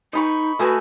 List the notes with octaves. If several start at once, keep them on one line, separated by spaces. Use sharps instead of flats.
D#4 D#5 B5 C#6
A3 F#4 G#4 B4